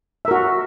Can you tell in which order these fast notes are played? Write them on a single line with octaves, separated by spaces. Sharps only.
E5 A#4 F#4